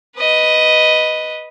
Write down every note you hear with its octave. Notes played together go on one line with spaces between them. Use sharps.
B4 D#5